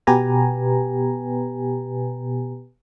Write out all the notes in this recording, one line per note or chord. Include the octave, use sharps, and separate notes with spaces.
B2 B3 G4 B4 G#5 A#5